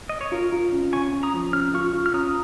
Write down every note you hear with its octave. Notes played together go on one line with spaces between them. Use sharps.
D#5
C#5
F4 A#4
F4
C#4
C#4 G#5 C#6
C#4
A#5 D#6
F3
C#4 F6
F4 C#6 F6
F4
F6
C#4 A#5 D#6